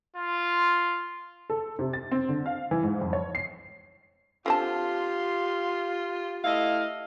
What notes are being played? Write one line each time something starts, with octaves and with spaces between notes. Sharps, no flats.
F4
A4
C3
A6
C4
D3
F5
E3
G#2
F2
C#5
C7
D3 C4 F4 G4 A5 C6
A3 E4 D#5 F5